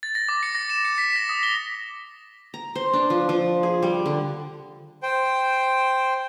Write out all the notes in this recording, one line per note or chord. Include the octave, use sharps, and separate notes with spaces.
A6
A#6
D6
C#7
A#6
E7
C#7
B6
A#6
D#6
G7
A#5
C5
D4
F3
F3
G#4
G3
D3
C5 G5